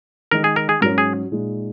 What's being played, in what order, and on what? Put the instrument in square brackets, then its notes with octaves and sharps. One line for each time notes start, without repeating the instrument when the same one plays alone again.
[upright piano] D#3 G#3 D#4 [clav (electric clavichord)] A#4
[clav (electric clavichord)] G#4
A#4
G#4
[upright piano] G#2 F#3 C#4 [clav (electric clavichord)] A#4
[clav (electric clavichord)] G#4
[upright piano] A#2 G#3 D#4